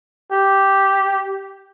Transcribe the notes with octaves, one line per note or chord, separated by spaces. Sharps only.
G4